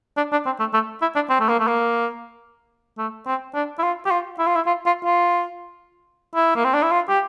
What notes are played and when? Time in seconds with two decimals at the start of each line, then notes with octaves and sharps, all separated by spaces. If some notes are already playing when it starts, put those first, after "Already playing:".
0.17 D4
0.32 D4
0.46 C4
0.59 A3
0.74 A3
1.02 E4
1.15 D4
1.30 C4
1.40 A3
1.49 A#3
1.59 A3
1.67 A#3
2.98 A3
3.26 C4
3.54 D4
3.79 E4
3.83 F4
4.05 G4
4.11 F4
4.39 E4
4.47 F4
4.56 E4
4.66 F4
4.86 F4
5.05 F4
6.35 E4
6.56 A#3
6.64 C4
6.74 D4
6.83 E4
6.91 F4
7.09 G4